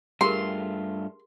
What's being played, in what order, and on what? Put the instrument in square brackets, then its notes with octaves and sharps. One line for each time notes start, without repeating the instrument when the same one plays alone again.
[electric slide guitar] G2 A3 F4 [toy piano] G4 G#4 A#4 [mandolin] C6